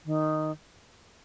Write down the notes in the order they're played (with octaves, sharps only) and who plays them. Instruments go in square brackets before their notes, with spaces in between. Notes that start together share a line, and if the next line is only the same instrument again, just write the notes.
[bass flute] D#3